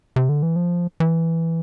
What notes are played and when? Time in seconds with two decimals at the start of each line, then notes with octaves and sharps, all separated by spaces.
0.16 C3
0.29 D3
0.43 E3
0.56 F3
1.00 E3